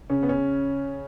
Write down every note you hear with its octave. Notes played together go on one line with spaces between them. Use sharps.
C#3 C#4
B3
C#3 C#4